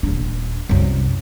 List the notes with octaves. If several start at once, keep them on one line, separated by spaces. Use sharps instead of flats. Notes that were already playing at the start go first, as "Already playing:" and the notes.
D#1 D4
C2 F#2